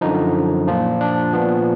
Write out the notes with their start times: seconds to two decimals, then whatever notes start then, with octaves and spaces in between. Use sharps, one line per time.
0.01 F#2 D3 F3 D#4
0.67 A#2 F3 F4
1.01 D4
1.33 A#2 F3 B3